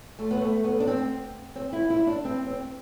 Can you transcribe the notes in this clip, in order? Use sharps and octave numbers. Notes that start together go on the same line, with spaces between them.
A3
B3
A3
B3
D4
C4
C4
E4
E4
D4
C4
C4